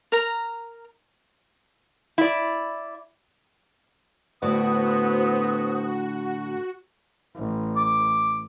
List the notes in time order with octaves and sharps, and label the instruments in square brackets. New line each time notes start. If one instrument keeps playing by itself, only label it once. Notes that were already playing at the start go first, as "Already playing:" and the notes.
[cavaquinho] A#4 A#5
[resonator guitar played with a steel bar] E4 D5
[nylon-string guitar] A2 D3 D5 [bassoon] B3 [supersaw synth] F#4 [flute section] C5 D#6
[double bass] A1
[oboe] D6